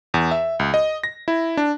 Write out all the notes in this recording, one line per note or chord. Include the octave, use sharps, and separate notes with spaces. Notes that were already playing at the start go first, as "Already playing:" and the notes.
E2
E5
C#2
D#5
A#6
E4
D4